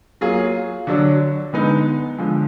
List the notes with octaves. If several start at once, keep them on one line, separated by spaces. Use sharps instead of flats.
F#3 A#3 F4 G#4
D3 F#3 D4
D3 G#3 B3 D#4
D3 F3 G#3